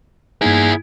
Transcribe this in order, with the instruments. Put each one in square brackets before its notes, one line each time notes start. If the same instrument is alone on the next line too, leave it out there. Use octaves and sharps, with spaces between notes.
[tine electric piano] G2 A#3 D#4 [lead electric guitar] E4 G#4